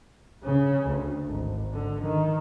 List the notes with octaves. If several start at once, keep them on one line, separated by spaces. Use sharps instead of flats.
C#3
D2
G#1
D3
D#3